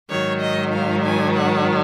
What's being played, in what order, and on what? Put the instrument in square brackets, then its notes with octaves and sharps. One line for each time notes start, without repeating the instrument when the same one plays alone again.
[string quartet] G#2 D#3 F#3 C#5
D#5
F5
G#5
F#5